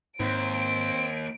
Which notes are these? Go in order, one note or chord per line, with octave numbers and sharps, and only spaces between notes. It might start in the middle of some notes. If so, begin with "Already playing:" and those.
D#2 G#2 C4 D7